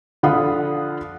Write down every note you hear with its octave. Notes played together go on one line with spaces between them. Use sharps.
D3 F3 F4 F#5 B5 D#6